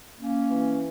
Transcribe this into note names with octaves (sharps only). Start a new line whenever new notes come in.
A#3 C#4
E3